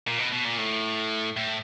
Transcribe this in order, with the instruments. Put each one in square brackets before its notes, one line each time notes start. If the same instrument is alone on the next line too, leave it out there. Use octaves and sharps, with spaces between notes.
[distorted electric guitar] A#2
B2
B2
A#2
A2
A2